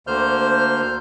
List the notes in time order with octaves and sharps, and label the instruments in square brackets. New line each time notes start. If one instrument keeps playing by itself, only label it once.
[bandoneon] D2 D3 A#3 C5 F6 G6